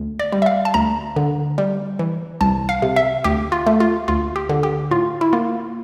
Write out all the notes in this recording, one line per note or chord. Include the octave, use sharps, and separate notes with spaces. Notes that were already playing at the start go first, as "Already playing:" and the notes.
Already playing: D2
D5
G3
E5
F5
A5
D2 A#5
D3
G3
E3
C2 A5
F5
C3
E5
D2 G4
F4
A3
F4
D2 F4
G4
D3
G4
A2 F4
E4
A#3 F4